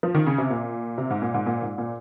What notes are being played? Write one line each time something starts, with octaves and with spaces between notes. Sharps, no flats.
F3
D#3
C#3
C3
A#2
C3
G#2
A#2
G#2
A#2
G#2
A#2